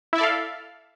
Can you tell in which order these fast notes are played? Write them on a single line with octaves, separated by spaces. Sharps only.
E4 E5 D5 A4 F5